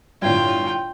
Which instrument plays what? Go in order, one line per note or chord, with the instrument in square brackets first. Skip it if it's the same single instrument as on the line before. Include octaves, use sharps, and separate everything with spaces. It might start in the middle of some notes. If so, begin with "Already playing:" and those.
[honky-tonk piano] G1 A2 F#3 [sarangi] F4 [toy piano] D5 F5 [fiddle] G5